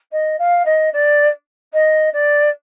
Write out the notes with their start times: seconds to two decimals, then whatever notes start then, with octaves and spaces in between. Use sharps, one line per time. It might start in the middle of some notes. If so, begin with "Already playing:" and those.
0.12 D#5
0.39 F5
0.65 D#5
0.93 D5
1.73 D#5
2.13 D5